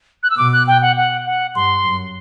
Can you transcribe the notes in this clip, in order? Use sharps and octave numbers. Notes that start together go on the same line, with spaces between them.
F#6
E6
B2 D6
F#6
G5
F#5
F#5
F#5
G2 C6
F#2